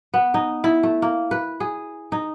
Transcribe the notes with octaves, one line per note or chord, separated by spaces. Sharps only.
B3
D#4
E4
A3
A#3
B4
G#4
D#4